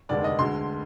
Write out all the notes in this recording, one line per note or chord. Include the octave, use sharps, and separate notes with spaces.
F1 D#2 D3 G#3 D5
D#5
D2 D3 G#3 C6